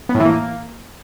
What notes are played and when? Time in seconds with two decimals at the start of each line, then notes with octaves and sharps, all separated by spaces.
0.09 B3
0.15 A2
0.20 E3
0.25 A#3